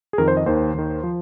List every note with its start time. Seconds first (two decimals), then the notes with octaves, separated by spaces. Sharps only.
0.13 G#4
0.18 F2 D#3 A#4
0.28 C5
0.37 D#5
0.46 D#2 D#3 C5
0.74 D#2 D#3
1.04 F3